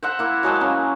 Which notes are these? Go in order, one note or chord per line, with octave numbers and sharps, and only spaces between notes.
C5 E5 F#5 A#5
A#3 E4
F#3 G#3 C5 A5
A#3 C#4